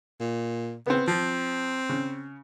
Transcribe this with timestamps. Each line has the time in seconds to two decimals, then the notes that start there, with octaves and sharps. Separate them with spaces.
0.20 A#2
0.86 C#3 B3 C4
1.07 F3 C4
1.89 C#3